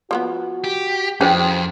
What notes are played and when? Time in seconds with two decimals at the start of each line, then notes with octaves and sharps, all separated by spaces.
0.11 F3 A#3 B3 F#4
0.64 G4
1.21 F2 E3 C#4 F#4 G#4 C5 G5